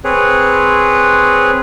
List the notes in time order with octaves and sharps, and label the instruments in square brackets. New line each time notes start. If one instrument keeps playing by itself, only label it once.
[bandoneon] C4 G#4 B4 C#5